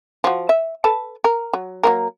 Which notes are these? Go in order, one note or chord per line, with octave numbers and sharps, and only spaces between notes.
F3 F#4
E5
A4 B4 A5
A#4
F#3
F#3 A#3 A#4